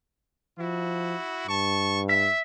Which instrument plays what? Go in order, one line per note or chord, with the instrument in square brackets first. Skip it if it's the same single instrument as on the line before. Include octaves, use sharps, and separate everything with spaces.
[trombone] F3 [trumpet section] E4 F#4
[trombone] G2 [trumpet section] A5 C#6
[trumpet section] E5 [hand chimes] B6